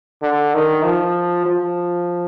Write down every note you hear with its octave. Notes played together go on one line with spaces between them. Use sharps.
D3
D#3
F3
F3